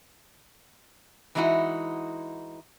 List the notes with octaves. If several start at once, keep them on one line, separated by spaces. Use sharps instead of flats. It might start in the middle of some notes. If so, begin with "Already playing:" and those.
E3 G#3 D#4 E4 F#4